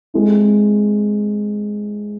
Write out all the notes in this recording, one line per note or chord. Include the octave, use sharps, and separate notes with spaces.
G#3 C4 E4